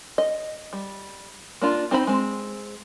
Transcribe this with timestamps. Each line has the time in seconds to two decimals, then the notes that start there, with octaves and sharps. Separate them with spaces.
0.18 D#5
0.73 G3
1.62 A#3 D4 F4
1.91 C4 D#4 C5 B5
2.07 G#3 C4